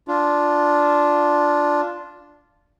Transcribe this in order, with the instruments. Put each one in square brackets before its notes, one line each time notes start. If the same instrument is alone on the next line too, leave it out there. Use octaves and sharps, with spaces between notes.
[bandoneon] D4 F4